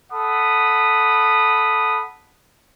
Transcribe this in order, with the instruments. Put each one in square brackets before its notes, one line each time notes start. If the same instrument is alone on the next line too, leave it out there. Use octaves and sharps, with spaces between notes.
[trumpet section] A4 F#5 B5 D#6